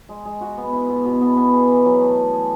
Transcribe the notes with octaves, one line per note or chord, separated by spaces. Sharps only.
G#3
G#3
F#4
B3
E4
B2
B2
B3
B3
G#4
E3
F#3
A3
A3
G#4